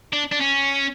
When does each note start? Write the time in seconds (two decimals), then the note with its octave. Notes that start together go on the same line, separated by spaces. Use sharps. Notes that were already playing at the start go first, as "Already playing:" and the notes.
0.13 D4
0.32 D4
0.40 C#4